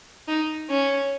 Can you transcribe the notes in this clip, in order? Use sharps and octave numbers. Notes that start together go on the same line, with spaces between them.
D#4
C#4